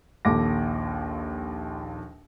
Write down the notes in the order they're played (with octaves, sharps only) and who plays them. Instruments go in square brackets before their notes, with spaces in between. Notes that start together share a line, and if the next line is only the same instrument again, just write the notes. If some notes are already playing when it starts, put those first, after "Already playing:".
[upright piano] A#1 D#2 A4 D6 A#6